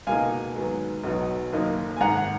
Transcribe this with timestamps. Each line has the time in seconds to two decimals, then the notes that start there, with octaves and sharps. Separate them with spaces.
0.07 C#2 B2 A#3 D#4 F5 G#5
0.56 G#2 D#3 F#3 B3
1.04 B1 B2 F#3 B3 D#4
1.53 F#1 F#2 D#3 A#3 D#4
1.97 G#5
2.01 G#1 G#2 D#3 F#5 A#5